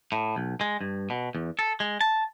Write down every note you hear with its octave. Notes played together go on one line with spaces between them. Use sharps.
A2
B1
G#3
G2
B2
E2
A4
G#3
A5